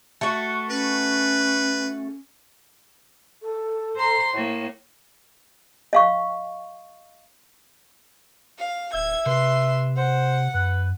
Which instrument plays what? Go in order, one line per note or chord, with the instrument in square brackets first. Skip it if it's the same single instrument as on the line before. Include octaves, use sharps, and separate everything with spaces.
[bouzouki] A3 F#4
[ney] C#4 [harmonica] B4
[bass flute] A4
[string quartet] C5 A#5 C6
A2 A#3
[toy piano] D#5 F5 C#6
[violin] F5
[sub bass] D1 [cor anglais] E5 [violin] G#6
[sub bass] C3 [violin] B4 C6
[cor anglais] C5 [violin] F#5
[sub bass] F#2 [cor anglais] B4